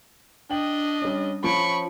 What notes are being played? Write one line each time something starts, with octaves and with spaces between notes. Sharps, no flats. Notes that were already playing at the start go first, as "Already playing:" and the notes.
D4 D#5 G5 F#7
G3 C#4
F3 C#4 B5 C#6 D7